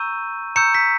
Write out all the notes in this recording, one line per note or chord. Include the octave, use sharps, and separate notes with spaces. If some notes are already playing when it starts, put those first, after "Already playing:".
Already playing: A#5 C#6 E6 G6 D#7
A#5 C#6 E6 G6 C#7
B6